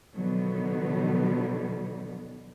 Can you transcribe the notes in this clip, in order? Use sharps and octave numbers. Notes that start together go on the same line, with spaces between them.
B2 D3 D#3 F3 F#3 B3